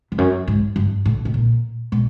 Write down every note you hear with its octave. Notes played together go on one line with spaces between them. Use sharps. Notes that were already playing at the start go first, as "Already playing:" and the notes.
F2
F#2
G#2
G2
A2
B2
A#2
B2